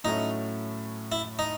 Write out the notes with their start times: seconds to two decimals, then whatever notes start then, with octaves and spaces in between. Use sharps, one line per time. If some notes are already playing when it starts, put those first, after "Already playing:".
0.04 A2 F#3 A3 C#4 D#4
1.12 E4
1.39 D#4